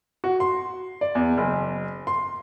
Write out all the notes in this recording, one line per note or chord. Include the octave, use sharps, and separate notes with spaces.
F#4
C6
D5
E2
F#1
C6